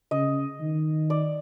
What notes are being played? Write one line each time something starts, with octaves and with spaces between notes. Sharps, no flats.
C#3 D#5
D#3
D5